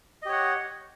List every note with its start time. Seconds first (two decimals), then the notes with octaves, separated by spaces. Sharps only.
0.22 D#5
0.26 G4
0.29 C#5
0.32 F#5